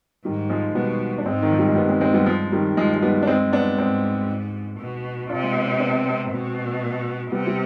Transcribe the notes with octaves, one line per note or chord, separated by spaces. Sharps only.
G#2 D#3 G3
F3 G#3
B2 G3 B3
D4
G#2 G#3 C4
D#3
F3
G3
G#3
G2 G3 B3
G#3 C4
G#3 C4
G3 B3
F3 G#3
D#3 G3
G2 F3 G#3
G#3
G3 B3
D4
G#3 C4
B3 D4
G#2 G#3 C4
B2
C3 D4 F4
G#3
B3
C4
B3 D4
G#3 C4
B2
C3 G3 B3
G3